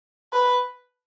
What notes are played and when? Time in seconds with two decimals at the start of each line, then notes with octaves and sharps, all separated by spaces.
0.33 B4